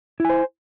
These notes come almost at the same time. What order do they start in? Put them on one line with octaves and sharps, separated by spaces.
E4 G#5 C5